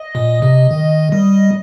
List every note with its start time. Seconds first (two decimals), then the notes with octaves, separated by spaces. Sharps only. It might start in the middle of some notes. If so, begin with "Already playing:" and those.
Already playing: D#5
0.15 A#2
0.42 C3
0.71 D#3
1.12 G3